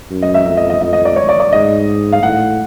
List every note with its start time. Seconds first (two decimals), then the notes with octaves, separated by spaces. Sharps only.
0.11 F#2
0.22 D#5
0.34 E5
0.46 F2 E5
0.57 D#5
0.70 D#5
0.81 F2 D#5
0.93 D#5
1.05 D5
1.16 C#5
1.29 D5
1.40 D5
1.52 G#2 D#5
2.12 F5
2.23 A2 F#5